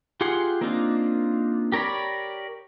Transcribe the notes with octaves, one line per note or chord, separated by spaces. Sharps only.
F4 G4 G#4 F#5 C6
A#3 C4 D4 D#4 F4
G4 A#4 C#5 D5 B5